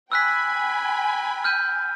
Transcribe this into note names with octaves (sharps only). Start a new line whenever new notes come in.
G5 G#5 B5 E6 F#6 B6
F6 G6 D#7